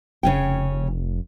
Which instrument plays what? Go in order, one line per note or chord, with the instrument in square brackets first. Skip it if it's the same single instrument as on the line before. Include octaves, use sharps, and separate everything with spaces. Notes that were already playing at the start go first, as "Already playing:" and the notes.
[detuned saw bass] F1 [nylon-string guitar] C#3 C#4 G5